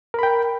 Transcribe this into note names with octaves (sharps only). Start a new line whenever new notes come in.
A#4 G5 B5